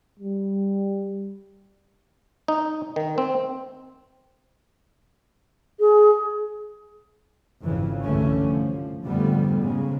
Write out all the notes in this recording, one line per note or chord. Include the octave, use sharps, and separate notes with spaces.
G3
D#4
D#3
C4
G#4
G#1 F2 C#3 E3
C2 G2 D3 E3 A3 C#4
F3
F2 G#2 D3 G3 A3 B3
G#2 C#3 G#3